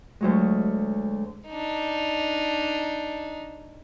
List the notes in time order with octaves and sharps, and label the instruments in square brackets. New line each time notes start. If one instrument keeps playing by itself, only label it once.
[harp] D2 F#3 G#3
[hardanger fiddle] D4 D#4